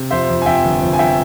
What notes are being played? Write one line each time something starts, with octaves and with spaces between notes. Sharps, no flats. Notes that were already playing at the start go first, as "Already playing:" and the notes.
Already playing: C3
F2 C5 E5
F2
G#5
F2 E5 G5
G1
F2
G#5
E5 G5